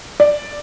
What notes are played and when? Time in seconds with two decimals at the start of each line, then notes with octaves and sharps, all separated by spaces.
0.20 D5